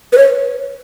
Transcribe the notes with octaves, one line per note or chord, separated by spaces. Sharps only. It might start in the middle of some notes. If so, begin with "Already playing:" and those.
B4
C#5